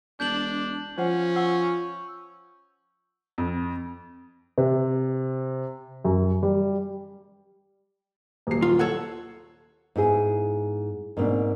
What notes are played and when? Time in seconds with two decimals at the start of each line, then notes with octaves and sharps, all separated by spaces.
0.20 E1 D4 G6 F#7
0.98 F3 C#4 C5 F#5
1.36 F#5 C#6 E6
3.38 F2
4.58 C3
6.05 F#2
6.43 G3
8.47 D#1 F#3 C7
8.62 F4
8.79 A4 C#5 F#5
9.96 G#2 B3 E4 G#4
11.17 G#2 B2 A#3 C4 D4